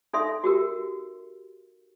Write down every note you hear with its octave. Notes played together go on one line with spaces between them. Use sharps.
D#4 A4 E5 C6
F#4 G4 A#4